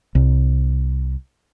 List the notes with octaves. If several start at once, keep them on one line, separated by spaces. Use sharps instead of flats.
C2